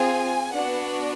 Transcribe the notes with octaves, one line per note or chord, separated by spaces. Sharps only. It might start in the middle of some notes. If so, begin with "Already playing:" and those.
Already playing: C4 F4 G#4 G#5
B3 D4 F#4 F#5